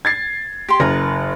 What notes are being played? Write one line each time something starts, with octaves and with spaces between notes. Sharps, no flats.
G#6 A6 C7
G4 C6
F#1 A#4 B4